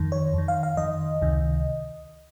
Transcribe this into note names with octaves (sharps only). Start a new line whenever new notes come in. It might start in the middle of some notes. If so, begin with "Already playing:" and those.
Already playing: F2 D#3
C#5
F2 D#3
F5
F5
F2 D#3 D#5
C#2 C3 D#3